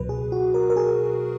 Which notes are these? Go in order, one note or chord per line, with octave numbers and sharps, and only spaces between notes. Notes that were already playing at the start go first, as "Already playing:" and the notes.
Already playing: C#2 B2 F#3 B4
G#4
F#4
A#4
A#4
G#4